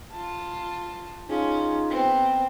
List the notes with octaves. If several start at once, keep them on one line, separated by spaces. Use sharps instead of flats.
F4 A5
C#4 D#4 F4 G#4
B3 C4